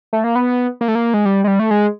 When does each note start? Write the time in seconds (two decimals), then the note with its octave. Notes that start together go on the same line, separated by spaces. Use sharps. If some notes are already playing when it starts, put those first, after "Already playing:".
0.13 A3
0.24 A#3
0.35 B3
0.81 A#3
0.88 A3
0.95 A#3
1.14 G#3
1.25 G3
1.44 G#3
1.47 G3
1.59 A3
1.71 G#3